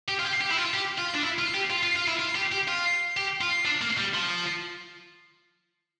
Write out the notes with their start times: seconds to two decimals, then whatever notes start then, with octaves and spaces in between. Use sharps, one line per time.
0.08 G4
0.19 F4
0.25 G4
0.41 G4
0.50 E4
0.57 F4
0.73 G4
0.98 F4
1.14 D4
1.22 E4
1.39 F4
1.54 G4
1.70 F4
1.83 F4
1.96 F4
2.07 E4
2.19 F4
2.35 G4
2.52 G4
2.68 F4
3.17 G4
3.41 F4
3.65 D4
3.82 A#3
3.98 G3
4.14 F3